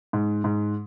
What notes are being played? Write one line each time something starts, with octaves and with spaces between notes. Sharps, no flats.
G#2
G#2